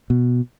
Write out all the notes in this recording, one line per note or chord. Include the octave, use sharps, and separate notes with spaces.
B2